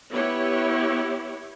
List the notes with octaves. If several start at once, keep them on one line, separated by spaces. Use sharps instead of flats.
B3 E4 G4 C#5